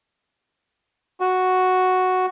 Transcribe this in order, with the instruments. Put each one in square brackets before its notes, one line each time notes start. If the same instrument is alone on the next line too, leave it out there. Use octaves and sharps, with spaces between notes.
[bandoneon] F#4